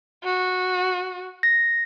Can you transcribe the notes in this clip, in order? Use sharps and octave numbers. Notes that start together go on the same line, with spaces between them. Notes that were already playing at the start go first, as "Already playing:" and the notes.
F#4
A#6